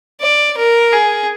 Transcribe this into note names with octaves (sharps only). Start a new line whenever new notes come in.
D5
A#4
G#4